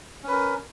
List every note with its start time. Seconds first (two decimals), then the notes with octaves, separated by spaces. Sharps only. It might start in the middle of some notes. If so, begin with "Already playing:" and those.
0.24 C#4
0.28 B4
0.32 A#4